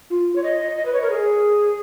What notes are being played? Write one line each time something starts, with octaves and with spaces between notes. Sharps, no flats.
F4
C#5
D#5
D#5
D#5
B4
C#5
A#4
G#4